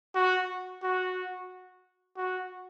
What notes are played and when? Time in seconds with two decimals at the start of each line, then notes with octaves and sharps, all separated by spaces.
0.15 F#4
0.83 F#4
2.16 F#4